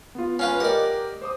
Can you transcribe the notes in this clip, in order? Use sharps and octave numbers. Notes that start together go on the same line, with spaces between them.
B3 F4
C#4 F4 B4 F#5
G4 A#4 D5 D#5 F#5
C5 D6 D#6